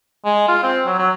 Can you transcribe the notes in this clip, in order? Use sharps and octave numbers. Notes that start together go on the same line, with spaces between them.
G#3
F4
C4
F#3
F#3